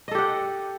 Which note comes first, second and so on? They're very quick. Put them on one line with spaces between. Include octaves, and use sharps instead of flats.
D#5 A4 G4 F#5